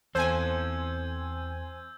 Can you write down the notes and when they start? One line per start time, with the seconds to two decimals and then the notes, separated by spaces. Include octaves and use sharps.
0.15 E2 C4 A4 C5 G#5 E6 G6 G#6